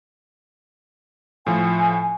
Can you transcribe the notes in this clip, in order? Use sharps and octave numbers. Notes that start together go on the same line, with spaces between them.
A2 F3 G#5